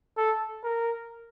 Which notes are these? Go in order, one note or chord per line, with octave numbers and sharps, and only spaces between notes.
A4
A#4